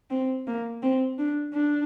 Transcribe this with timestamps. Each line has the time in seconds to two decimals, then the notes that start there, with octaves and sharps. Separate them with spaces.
0.10 C4
0.47 A#3
0.83 C4
1.19 D4
1.54 D4